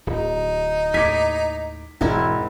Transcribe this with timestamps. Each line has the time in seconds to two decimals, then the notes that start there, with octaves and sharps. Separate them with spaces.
0.07 D1 D#4
0.94 D#2 A2 G#5 D6 B6
2.01 E1 G#2 C4 E4 A#4